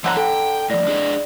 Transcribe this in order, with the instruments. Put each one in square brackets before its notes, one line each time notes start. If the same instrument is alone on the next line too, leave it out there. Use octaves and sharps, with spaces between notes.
[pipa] D3 F#5 A#5 [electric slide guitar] F3 C#5 D#5
[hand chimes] A4 [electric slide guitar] G5
[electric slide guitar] A2 F3 [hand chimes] D5 A#6
[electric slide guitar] D4 G#4 D#5